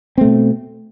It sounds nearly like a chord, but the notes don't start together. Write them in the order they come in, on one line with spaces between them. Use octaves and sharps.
C4 A3 B2